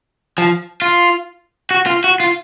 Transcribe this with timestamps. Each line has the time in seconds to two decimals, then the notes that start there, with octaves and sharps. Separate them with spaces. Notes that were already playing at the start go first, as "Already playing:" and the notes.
0.38 F3
0.82 F4
1.71 F#4
1.86 F4
2.04 F#4
2.20 F4